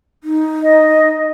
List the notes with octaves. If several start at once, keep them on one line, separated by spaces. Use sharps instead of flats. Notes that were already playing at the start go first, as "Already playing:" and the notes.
D#4
D#5